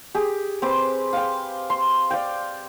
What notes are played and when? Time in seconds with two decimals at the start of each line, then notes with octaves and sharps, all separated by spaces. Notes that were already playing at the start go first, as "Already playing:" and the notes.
0.14 G4 G#4
0.62 C4 B4 D6
1.13 F5 G5
1.70 C6
2.10 D5 F5 G5